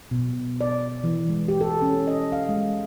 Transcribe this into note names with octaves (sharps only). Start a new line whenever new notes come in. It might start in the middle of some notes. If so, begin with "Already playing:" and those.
B2
D5
E3
G#3
G4
A4
C#4
D#5
F5
G#3